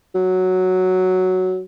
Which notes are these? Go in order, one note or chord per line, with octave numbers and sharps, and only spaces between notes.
F#3